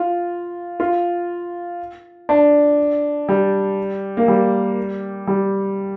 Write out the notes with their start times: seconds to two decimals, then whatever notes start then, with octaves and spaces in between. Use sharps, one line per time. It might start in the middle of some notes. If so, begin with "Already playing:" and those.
Already playing: F4
0.80 F4
2.29 D4
3.29 G3
4.17 A#3
4.28 G3
5.27 G3